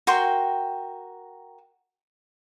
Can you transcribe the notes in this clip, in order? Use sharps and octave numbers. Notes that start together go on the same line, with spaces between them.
F#4 A#4 G5 C6